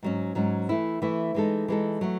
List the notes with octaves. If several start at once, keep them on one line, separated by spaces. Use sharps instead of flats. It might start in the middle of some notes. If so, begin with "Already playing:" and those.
G#2 F#3 C#4
G#2 F#3 C#4
E3 A3 E4
E3 A3 E4
E3 G#3 D#4 A4
E3 G#3 D#4 A4
F#3 A3